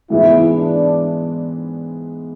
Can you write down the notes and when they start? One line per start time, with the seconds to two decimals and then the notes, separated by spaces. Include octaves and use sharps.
0.10 G#2 E3 G#3 B3 E4
0.57 D4